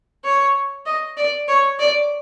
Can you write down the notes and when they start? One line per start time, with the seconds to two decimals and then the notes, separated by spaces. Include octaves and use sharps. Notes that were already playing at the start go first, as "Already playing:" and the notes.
0.24 C#5
0.86 D#5
1.17 D5
1.48 C#5
1.79 D5